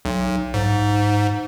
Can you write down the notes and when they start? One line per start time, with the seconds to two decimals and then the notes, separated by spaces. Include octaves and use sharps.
0.05 B1
0.54 G#2